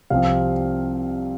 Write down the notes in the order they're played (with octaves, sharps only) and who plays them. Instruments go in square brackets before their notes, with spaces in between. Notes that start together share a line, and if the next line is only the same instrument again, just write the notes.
[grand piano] C2 C3 F3 C4 F5